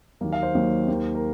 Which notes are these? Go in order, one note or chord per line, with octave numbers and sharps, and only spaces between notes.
D#2 D#3 F#3 A#3
F5
C5
D#2 D#3 F#3 A#3
D#2 D#3 A#3
A#4